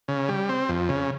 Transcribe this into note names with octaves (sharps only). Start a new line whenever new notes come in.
C#3
G3
C4
F2
C#3